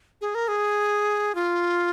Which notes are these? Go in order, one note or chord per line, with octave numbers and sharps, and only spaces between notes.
G#4
A#4
G#4
F4